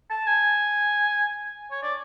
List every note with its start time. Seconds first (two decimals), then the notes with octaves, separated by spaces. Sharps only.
0.11 A5
0.27 G#5
1.71 C#5
1.83 D5